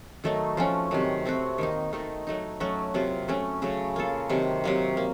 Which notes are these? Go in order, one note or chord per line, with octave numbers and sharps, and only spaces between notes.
D#3 F#3 A3 D#4
F3 A3 C#4 F#4
C3 D#3 F#3
A3 C4 F#4
D#3 A#3 D#4
D#3 A3 D#4
F#3 A3 D#4
F#3 A3 C#4 F#4
C3 F#3 A#3 F4
F#3 A3 C#4
C#3 F#3 A3
A#3 F4 A4
C3 D#3 F#3
C3 F#3 A#3
A#3